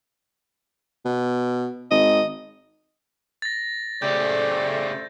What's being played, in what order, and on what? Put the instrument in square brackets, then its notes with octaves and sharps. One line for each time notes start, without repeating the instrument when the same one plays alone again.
[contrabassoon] B2
[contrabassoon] G#1 [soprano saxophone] D#5
[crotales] A6 A#6
[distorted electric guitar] C#3 G4 [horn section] A3 E4 C5 [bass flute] D5 [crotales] G6